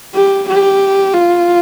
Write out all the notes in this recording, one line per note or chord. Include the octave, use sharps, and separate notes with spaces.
G4
G4
F4